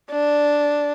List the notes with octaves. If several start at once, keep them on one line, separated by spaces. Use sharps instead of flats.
D4